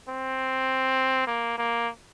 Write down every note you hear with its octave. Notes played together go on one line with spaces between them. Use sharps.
C4
A#3
A#3